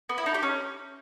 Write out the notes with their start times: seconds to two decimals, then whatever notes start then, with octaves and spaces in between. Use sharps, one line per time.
0.09 B3
0.18 E4
0.26 D#4
0.34 G4
0.43 C#4